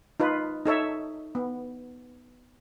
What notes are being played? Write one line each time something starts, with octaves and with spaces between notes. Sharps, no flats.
D#4 F4 B4
D#4 A4 C#5 E5
B3